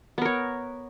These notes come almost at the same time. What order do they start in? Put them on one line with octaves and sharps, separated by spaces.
B3 A#4 C#5